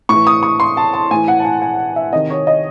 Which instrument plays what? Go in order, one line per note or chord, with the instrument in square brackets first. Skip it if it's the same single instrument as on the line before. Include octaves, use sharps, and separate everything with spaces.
[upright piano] A2 E3 C#6
D#6
C#6
C6
A5
A5
A2 E3 G#5
F#5
A5
G#5
G#5
E5
C3 D#3 D#5
C#5
D#5